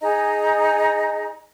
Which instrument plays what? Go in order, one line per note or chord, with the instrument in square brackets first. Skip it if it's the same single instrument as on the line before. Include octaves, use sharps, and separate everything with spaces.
[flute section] D#4 G#4 D#5 A#5